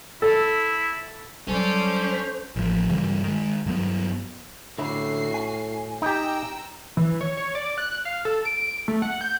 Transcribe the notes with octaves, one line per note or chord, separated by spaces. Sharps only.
E4 A4
F#3 G3 C#4 A4 C5 D5
A1 F3
G2 C#3 E3 G3
D#3 G#3
G2 F#3 B3
A2 D3 C#4 E4 F#4 C7
G#5
D#4 G4 G5 A#5 E6
E3
C#5
C#5
D5
F#6
F5
A4
D7
A3
F#5
G6